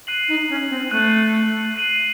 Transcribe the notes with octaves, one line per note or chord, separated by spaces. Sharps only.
F#6 C7 D#7 F#7
D#4
C#4
C4
A3 F#6 C7 D#7 F#7
F#6 C7 D#7 F#7